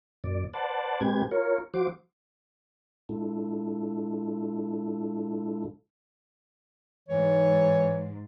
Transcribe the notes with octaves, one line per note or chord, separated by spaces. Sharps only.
F#2 A#2 D5
B4 C5 D5 F#5 A5
A#2 G#3 C4 G4 B4 G#6
F4 A#4 C#5
F3 F#4 C5 D6
A#2 G#3 D4 E4 F4 A4
G#2 E3 C#5